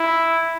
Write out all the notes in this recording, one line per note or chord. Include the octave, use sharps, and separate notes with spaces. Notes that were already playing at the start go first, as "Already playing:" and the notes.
Already playing: E4